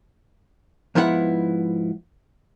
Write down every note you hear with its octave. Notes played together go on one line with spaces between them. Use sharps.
G#2 F3 B3 E4 A4 F#5